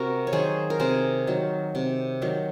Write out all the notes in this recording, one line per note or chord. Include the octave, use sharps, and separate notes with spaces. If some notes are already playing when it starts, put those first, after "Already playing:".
Already playing: C3 F#4 A#4
C#5
D#3 F#3 G#4 C5
A#4
C3 G#4 C5
D#3 F#3
C3
D#3 F#3